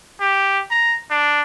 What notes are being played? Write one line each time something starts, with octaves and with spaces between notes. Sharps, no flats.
G4
A#5
D4